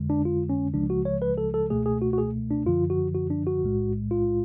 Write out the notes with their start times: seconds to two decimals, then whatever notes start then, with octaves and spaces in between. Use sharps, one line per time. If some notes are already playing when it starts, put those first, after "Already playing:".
Already playing: F2 D3 G#3
0.10 D4
0.25 F4
0.49 C#4
0.74 C#2 C#3 F3 G#3 D4
0.90 F#4
1.05 C#5
1.22 B4
1.38 A4
1.54 A4
1.70 C#2 B2 A3 G#4
1.86 G#4
2.02 F#4
2.13 F#4
2.18 G#4
2.50 D4
2.66 F#2 D3 F3 F4
2.90 F#4
3.15 F#4
3.30 D4
3.47 F#4
3.62 B1 A2 G#3
4.11 F4